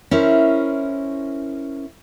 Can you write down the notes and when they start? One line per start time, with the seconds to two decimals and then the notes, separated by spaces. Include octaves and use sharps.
0.11 C#4 E4 A#4 C5